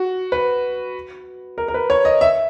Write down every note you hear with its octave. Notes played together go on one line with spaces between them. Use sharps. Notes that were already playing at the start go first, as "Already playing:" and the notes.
Already playing: F#4
B4
A#4
A#4
B4
C#5
D#5
E5